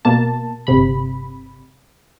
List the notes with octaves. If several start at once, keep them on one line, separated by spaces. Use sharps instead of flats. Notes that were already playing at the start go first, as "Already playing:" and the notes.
B2 A#3 A5
G1 C3 B5